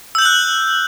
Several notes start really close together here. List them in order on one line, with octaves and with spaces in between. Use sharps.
E6 G6 F#7 F#6